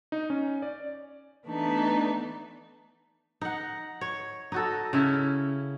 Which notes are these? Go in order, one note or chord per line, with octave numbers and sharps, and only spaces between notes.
D#4
C#4
D5
E3 A3 B3 D4 D#4
D#4 F#5
C#5
D#4 F#4 A4
C#3 C#4 E4